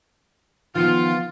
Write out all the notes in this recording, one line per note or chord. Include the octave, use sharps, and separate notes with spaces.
D#3 F3 B3 F4